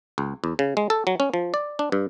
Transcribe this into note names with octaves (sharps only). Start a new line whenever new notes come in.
C#2
E2
C#3
G#3
A4
F#3
C#4
F3
D5
D4
G2